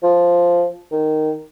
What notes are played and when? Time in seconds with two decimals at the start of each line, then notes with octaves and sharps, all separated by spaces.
0.03 F3
0.92 D#3